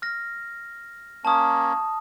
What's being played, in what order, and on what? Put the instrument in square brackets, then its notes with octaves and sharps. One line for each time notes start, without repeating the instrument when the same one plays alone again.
[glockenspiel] F6 A#6
[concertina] A#3 C#4 [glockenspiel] A5 D#6